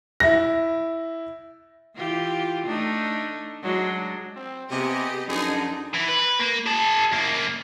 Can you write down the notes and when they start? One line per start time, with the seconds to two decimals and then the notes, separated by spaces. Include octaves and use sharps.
0.20 E4 A#6
1.95 E3 F4 G4
2.66 A3 D4 D#4
3.62 F#3 G#3 D4
4.35 C4
4.71 C3 B3 G4 G#4 D#5
5.29 F#2 D3 F3 D#4 G#4
5.94 E3
6.08 B4
6.40 A#3
6.66 G#4 A5
7.12 F#2 A#3